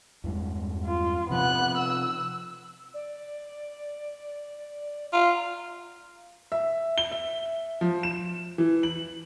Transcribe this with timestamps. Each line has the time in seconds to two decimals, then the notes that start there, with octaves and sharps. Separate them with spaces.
0.24 E2 G2 G#3
0.86 F4
1.30 C3 F3 B3 F#6
1.78 E6
2.94 D5
5.13 F4 A#5
6.52 E5
6.98 G7
7.12 E5
7.81 F3
8.03 E7
8.58 E3
8.83 F#7